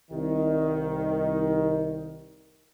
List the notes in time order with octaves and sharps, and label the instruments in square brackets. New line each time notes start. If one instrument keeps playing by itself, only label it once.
[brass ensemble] C2 D#3